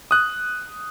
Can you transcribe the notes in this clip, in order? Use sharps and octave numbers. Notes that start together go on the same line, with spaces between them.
D#6 F#6